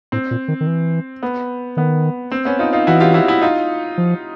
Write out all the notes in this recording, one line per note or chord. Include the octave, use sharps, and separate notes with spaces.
A2 C4
A#2
D#3
D#3
E3
B3
D#3 B3
C4
B3 C#4
D#4 F4
D#4 F4
E3 E4 F#4
F4 G4
E4 F#4
E4 F#4
D#4 F4
F3